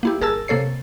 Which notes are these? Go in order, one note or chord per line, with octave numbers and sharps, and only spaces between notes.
A#3 E4 G4
G1 G#4 A#4 A5 E6
C3 A#3 A4 C#5 C7